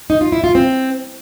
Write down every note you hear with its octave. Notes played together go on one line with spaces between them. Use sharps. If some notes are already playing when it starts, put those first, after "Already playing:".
D#4
F4
E4
F4
C4